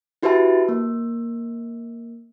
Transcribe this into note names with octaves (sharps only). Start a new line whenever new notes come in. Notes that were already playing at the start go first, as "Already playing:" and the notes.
E4 F#4 G4 B4 E5 A5
A#3